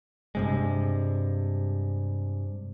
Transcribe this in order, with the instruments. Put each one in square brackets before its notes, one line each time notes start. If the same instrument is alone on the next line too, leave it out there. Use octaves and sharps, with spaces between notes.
[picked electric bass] G2 C3 G#3